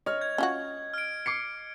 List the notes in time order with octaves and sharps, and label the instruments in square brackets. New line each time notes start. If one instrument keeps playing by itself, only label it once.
[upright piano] C#5 F6 [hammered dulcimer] D#5
[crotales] G#6
[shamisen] C#4 F4 F#4
[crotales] F6 D7
[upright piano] D6 C7 C#7